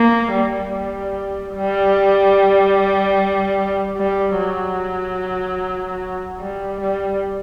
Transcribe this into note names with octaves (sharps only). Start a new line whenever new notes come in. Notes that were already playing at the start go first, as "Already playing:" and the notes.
Already playing: A#3
G3
G3
G3
G3
F#3
G3
G3